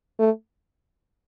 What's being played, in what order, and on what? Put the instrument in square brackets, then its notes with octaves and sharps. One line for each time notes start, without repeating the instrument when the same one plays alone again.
[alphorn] A3